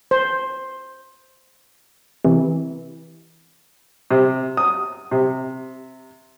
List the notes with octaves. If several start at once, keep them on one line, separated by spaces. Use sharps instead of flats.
C5
C3 E3
C3
D#6
C3